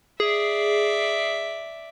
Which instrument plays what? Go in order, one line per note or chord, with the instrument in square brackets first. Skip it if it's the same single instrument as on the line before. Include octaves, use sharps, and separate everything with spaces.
[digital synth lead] G#4 [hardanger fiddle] D5 E5